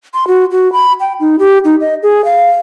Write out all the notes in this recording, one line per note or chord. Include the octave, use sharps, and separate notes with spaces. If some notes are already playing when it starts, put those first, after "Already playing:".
C6
F#4
F#4
B5
G5
D#4
G4
D#4
D#5
G#4
F5